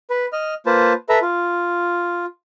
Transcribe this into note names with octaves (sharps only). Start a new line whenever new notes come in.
B4
D#5 F6
A#3 F4 B4 C5 A5
A4 B4 E5 A#5
F4